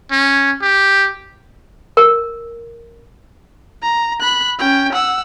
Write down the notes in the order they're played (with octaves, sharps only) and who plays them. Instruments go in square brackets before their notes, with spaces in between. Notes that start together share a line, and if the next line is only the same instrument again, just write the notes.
[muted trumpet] C#4
G4
[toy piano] A#4
[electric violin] A#5
B5 F#6
C#4 G5
F#5 E6